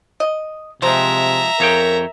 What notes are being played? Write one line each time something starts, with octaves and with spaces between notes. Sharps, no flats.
D#5
C3 F3 G#3 C4 G4 C5 E5 A#5
F2 C#3 A#4 C#5 G5